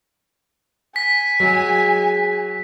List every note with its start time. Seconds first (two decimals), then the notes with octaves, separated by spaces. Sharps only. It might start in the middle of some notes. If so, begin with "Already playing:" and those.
0.96 G#5 B6
1.40 F#3 G#3